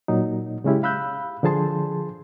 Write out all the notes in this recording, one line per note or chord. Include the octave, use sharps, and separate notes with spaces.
A#2 F#3 D#4
C#3 G#3 C#4 E4 G4
F5 B5 E6 F#6 G6
D3 F3 G#4 A5 C6